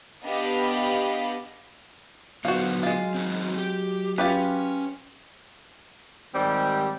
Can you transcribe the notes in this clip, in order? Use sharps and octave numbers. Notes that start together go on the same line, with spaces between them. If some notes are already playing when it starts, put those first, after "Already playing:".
B3 D4 G4 D#5 F5 B5
D3 F#3 B3 D#4 F#4 C5 F5
G#3 F4
C4 D#4 F#4
G4
C#4 F4 G4 B4
G#2 D#3 G3 C4 G4